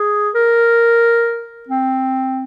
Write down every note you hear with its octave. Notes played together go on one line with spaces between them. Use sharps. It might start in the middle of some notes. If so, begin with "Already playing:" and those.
Already playing: G#4
A#4
C4